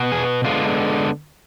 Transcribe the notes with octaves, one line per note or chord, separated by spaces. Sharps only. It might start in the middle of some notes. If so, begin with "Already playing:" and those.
Already playing: B2 B3
G#4
D3 G#3 B3 F4